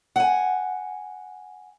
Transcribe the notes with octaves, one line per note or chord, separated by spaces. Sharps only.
F#5 G#5